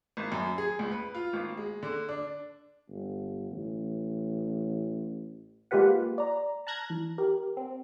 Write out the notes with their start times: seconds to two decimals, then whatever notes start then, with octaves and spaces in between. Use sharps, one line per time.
0.17 G#1
0.32 F#2
0.58 G#4
0.79 C#2
0.91 B4
1.15 F4
1.33 G#1
1.57 G#3
1.83 D3
2.09 D4
2.90 G1
3.51 A1
5.71 G#3 A#3 F4 G4 B4 F#5
6.18 D5 A#5
6.67 A5 A#5 F6 F#6 G#6 A#6
6.90 E3
7.18 G4 A#4
7.57 C4